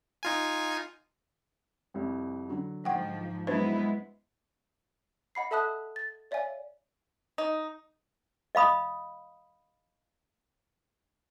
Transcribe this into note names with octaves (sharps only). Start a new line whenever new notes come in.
D#4 F4 G#5
C2 F2
D3 F#3
G#2 F3 F#5 G5
F#3 G#3 B3 D4 E4 B4 C5
D#5 F#5 B5 C7
A4 E5 A5 D#6 F#6
A6
C#5 D5 E5 F5 G#5
D#4
D#5 F5 B5 D#6